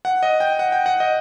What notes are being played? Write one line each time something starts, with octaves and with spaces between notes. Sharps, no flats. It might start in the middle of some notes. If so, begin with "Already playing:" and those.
F#5
D#5
G5
F#5
G5
F#5
D#5